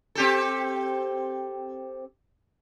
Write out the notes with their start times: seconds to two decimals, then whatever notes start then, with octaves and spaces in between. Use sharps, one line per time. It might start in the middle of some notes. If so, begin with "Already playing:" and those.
0.15 C4 G4 A4